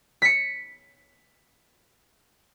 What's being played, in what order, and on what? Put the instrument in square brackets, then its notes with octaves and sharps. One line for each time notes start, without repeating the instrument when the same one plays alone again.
[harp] B6 C#7